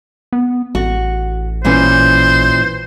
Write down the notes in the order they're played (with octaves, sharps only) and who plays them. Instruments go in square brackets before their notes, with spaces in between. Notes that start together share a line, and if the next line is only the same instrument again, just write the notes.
[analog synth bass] B3
[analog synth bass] A1 [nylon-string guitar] F#4
[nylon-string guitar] A#2 E3 C#4 [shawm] C5